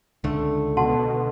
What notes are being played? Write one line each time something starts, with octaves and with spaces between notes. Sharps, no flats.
C#2 D3 A3
B2 F#5 A5 C6